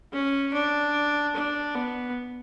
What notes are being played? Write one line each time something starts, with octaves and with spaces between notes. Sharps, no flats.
C#4
D4
D4
B3